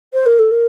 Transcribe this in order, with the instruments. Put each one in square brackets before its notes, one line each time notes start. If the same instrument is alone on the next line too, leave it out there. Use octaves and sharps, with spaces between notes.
[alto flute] C5
A#4
A4
A#4